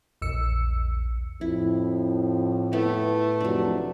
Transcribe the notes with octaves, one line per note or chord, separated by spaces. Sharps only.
A#1 E2 E6 C#7
F2 A2 E4
A3 B3 E4 A4
F1 F#3 D4